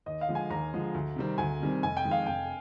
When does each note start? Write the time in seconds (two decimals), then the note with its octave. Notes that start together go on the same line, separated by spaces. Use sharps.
0.06 D#2 D#5
0.21 F5
0.28 D3 F3 G#3
0.35 G#5
0.50 D#2 A#5
0.73 D3 F3 G#3
0.94 D2
1.16 C3 D#3 G3 C4
1.38 D2 G#5
1.60 C3 D#3 G3 C4
1.83 F1 G#5
1.97 G5
2.04 F2 D#3 G#3
2.11 F5
2.26 F1 G5